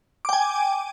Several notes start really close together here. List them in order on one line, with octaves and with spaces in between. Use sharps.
D6 G5 G#5